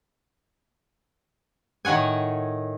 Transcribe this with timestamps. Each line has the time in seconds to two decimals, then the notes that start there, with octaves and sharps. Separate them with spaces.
1.85 A2 D#3 C#5 F#5 G#5